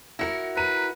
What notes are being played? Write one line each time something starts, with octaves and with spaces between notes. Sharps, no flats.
E4 F#4 A#4 A#6 C#7
B4 A#5 D#7